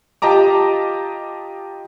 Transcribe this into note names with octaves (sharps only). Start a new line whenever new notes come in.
F4 G4 D#5 A5 A#5 D6